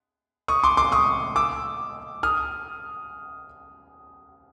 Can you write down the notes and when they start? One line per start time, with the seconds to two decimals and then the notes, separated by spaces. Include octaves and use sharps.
0.48 C#6 D#6
0.64 C6 D6
0.77 C6 D6
0.92 C#6 D#6
1.36 D6 E6
2.23 D#6 F6